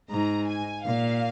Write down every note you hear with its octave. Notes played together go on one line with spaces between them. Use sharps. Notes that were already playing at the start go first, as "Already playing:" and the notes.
G#2 A#5
G#5
A#2 F5